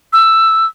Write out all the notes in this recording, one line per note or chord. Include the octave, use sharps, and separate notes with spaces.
E6